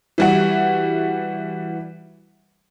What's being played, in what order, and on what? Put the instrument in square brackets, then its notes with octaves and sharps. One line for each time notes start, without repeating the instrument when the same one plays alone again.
[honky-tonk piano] E3 G3 F#4